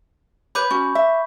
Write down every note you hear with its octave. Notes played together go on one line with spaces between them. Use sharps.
B4 C#5 B5 D6 G6
C#4 F#4 C#6
E5